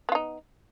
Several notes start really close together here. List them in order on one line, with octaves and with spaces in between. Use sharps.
B3 F4 D#4